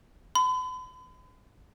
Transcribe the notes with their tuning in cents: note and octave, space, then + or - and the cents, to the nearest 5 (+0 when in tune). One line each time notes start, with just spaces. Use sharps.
B5 +45